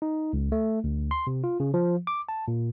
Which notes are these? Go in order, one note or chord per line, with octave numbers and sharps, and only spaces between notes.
D#4
C#2
A3
D2
C6
C3
F4
C#3
F3
D6
A5
A#2